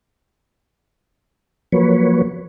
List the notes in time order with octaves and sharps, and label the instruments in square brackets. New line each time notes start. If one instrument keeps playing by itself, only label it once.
[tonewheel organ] F3 F#3 A#3 B4 C#5